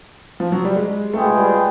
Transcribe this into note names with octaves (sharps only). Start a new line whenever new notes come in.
F3
F#3
G3
G#3
A3 F4 G#4 B4 D#5 G5
G#3
G3
G#3